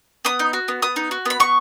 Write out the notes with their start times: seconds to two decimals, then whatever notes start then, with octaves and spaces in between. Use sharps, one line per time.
0.25 B3 D#6
0.39 D#4
0.53 F#4
0.68 B3
0.82 B3 D#6
0.96 D#4
1.11 F#4
1.26 B3 B5
1.40 B3 C#6